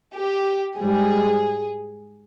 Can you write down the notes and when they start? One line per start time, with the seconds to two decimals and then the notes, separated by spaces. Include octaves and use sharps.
0.14 G4
0.76 G#2 G3 G#4